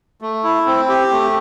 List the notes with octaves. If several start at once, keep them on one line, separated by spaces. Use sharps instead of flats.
A3
E4
C4
G4
A3